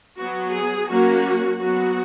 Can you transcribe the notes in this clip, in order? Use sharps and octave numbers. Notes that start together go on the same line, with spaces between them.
F#3 B3 F#4
G#4
F#3 A#3 C#4 F#4
F#3 B3 F#4